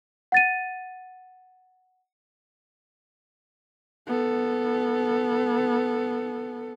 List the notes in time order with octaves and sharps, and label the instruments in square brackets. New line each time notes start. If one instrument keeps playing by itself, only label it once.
[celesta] F#5 A6 D#7
[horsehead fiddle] B3 A4